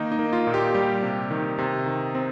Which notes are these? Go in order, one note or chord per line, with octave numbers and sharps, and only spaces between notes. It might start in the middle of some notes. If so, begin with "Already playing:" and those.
Already playing: D#3 A#3 D#4
D#4
A#3
F4
A#2
G4
G3 G4
C3
D#3
C3
D#3
C4